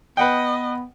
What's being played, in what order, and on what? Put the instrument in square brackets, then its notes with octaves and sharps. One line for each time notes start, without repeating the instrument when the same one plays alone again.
[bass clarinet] B3 [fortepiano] B4 F#5 G5 [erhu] D#5